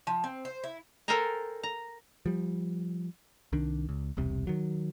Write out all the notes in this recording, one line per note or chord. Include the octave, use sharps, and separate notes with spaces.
F3
C4
C5
E4
A4 A#4 C5 G5 G#5 A#5
A#5
F3 G3
C2 D#3 D4
C#2
E1 C2 C3
D#3 F#3